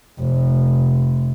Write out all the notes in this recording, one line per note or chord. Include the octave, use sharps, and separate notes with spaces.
F1